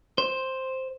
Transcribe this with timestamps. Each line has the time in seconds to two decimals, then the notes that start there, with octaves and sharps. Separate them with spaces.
0.18 C5